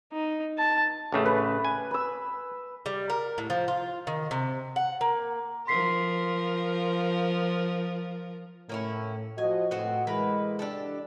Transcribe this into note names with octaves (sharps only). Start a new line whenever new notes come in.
D#4
A5
A1 C#3 A3
B4
G#5
B5 E6
G3
A#4
A2
F3
F4
D#3
C3
F#5
A#3
F3 A#4 C6 B6 C7
A2 A#3 C#4 E4
F3 F#4 D#5 G#5
A2 B3 C4 F#4
A2 E3 G#3 A#3 B4
D4 G4 A4